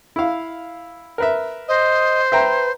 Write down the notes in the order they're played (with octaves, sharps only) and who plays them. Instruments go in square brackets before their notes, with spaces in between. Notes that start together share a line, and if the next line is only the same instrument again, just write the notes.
[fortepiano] E4 F5
A#4 B4 E5
[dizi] C5 [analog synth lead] D#5
[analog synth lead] B4 [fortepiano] E5 G5 A#5